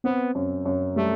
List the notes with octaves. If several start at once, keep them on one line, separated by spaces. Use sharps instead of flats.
B3 C4
F#2
F#2
G3 A3